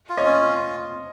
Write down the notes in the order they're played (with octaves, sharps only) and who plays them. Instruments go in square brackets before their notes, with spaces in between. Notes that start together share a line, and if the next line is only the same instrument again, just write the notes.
[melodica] F4
[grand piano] C#5 D#5
[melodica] C#4
F4